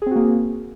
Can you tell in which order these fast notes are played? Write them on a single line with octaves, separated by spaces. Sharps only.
G#4 C4 F#4 A#3